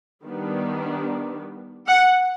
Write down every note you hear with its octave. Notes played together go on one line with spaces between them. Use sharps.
D#3 G3 B3 D4
F#5